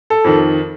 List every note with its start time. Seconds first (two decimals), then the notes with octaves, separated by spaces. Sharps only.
0.10 A4
0.25 F2 D#3